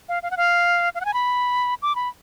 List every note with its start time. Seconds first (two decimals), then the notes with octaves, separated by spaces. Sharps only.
0.09 F5
0.23 F5
0.31 F#5
0.37 F5
0.95 F5
1.01 F#5
1.05 G#5
1.14 B5
1.82 D6
1.95 B5